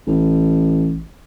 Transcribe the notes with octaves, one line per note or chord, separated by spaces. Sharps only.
A1